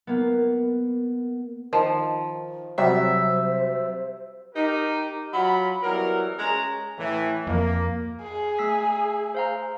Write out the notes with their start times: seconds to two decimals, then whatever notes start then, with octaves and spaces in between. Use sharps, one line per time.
0.07 A#3 B3
1.73 D#3 F3
2.78 C3 F#3 G3 C5 E5
4.55 D#4 G4 A#4
5.34 F#3 F4 B5
5.83 E3 F#3 G3 B3 A#4
6.39 G#3 C#4 G#4 A#5
6.98 A2 E3
7.47 F2 A#3
8.22 G#4
8.59 A3 E6 B6
9.35 C5 F5 A#5